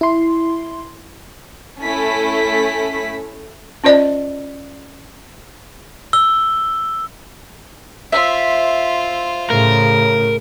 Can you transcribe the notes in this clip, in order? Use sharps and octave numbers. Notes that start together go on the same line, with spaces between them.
E4 C6
A3 C#4 E4 A4 B6
C#4 F4 C5 D5 D#5
E6 G7
F4 C5 E5
A2 C#3 A#4